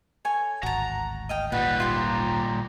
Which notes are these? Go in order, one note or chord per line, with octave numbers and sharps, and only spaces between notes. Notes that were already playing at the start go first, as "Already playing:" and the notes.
A4 C#5 G#5
D1 G#1 F#4 A5 A#5
D#5 F5 G5
A#2 G3 B4 F#5
F4 G4
A#5